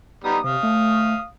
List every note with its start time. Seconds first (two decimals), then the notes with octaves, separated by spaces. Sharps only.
0.24 G3 B3 D#4 D#6
0.44 C3 F5 D#6
0.63 A3